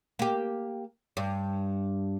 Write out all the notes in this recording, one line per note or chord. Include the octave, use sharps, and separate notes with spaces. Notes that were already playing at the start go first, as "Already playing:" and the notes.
A#3 G4
G2